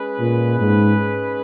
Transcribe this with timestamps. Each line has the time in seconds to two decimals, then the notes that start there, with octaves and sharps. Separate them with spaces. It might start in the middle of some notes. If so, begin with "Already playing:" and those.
Already playing: G#3 C#4 G#4 B4
0.20 A#2
0.60 G#2